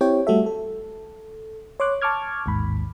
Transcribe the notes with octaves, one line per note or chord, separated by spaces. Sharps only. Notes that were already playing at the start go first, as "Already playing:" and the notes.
C4 E4 G4 C#5 G5
G3 A3 F#4 A4 E5
A4
C#5 C6 D6 F#6
A5 C#6 D6 F6 G#6
A1 D#2 G#2 B5